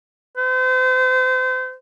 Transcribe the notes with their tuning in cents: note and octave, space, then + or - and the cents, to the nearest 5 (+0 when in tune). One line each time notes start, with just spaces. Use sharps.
C5 -35